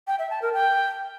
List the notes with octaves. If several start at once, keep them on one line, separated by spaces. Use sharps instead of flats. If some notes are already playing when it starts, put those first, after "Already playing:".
G5
E5
A5
A#4
G5